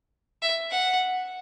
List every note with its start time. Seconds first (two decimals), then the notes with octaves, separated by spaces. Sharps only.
0.42 E5
0.70 F#5